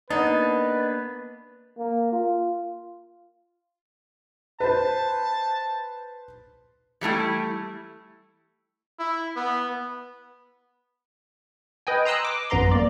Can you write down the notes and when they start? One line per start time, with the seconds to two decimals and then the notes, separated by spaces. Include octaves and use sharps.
0.10 A#3 B3 D4 D#4 B4
1.78 A#3
2.12 F4
4.60 B4 C5 A5
7.01 E3 G3 A3 E4
8.99 E4
9.36 B3
11.87 B4 D#5 G5 G#5
12.05 A#5 C6 D#6 E6 F#6
12.25 D6
12.50 A1 F#2 B3 A#5 C6
12.72 A#3 D5